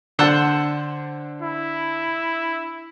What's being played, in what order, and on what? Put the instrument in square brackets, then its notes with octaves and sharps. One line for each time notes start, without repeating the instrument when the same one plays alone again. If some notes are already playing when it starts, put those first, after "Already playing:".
[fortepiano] D3 A5 [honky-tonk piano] D4 [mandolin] C5 F#5 E6
[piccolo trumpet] E4